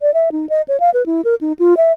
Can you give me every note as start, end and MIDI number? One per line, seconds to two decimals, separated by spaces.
0.01 0.13 74
0.14 0.29 76
0.32 0.49 63
0.49 0.62 75
0.68 0.79 73
0.80 0.90 77
0.94 1.05 71
1.06 1.21 64
1.25 1.35 70
1.41 1.53 63
1.59 1.74 65
1.77 1.92 76